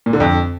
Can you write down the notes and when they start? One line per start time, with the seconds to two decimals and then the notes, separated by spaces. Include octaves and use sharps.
0.06 A#2
0.13 D3
0.20 F2